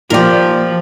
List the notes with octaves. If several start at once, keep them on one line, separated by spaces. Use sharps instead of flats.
A#2 F3 G4 A#4 D5